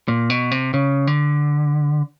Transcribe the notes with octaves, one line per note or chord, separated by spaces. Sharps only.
A#2
B2
C3
C#3
D3